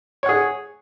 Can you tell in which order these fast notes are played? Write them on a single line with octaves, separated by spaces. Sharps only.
C#5 F#5 G#4